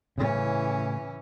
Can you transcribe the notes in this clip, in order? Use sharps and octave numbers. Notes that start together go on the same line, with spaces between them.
A2 C#3 E3 C#4